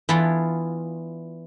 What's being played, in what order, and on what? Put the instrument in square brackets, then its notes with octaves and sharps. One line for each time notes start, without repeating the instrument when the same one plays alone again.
[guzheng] E3 B3 D4 E4 F4